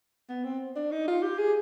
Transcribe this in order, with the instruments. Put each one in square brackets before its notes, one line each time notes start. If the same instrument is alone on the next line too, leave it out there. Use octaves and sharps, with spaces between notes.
[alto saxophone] B3
C4
D4
D#4
F4
G4
G#4